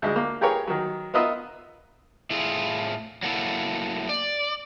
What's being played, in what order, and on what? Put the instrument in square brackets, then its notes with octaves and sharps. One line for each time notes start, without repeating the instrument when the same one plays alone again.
[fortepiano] D2 G#3
A#3
G4 G#4 A#4 B4 C#5
D#3 F#3
B3 F4 A#4 B4 D#5 E5
[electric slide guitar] A2 E4 F4 G#4
F#3 A3 A#3 E4
D5